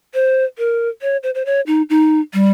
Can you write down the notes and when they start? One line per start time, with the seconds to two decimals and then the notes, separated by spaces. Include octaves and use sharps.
0.14 C5
0.58 A#4
1.02 C#5
1.23 C5
1.35 C5
1.46 C#5
1.67 D#4
1.90 D#4
2.34 G3